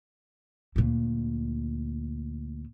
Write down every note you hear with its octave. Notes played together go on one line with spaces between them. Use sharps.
D2 A#2